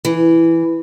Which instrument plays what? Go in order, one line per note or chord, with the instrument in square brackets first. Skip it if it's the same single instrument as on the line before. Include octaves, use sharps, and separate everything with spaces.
[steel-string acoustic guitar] E3